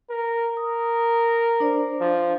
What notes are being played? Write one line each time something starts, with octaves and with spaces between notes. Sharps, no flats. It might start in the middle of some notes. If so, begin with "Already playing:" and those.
A#4
A#4 D#6
D4 C5 D5
F3